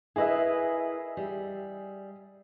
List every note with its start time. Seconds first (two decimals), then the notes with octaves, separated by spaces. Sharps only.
0.16 E4 G#4 A#4 B4 D#5 E5
1.17 G3